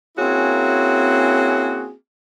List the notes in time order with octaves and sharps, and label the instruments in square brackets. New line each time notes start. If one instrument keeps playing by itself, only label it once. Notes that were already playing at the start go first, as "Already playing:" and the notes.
[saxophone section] A#3 C4 C#4 E4 F#4 G#4